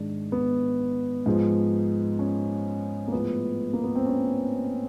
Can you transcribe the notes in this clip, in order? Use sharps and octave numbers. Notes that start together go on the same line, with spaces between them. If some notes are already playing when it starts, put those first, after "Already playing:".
Already playing: G#2 D#3 G#3 D4
B3
G#2 F3 G#3
C#4
A#3
A2 F3 G#3 B3
A#3
B3
C4
C#4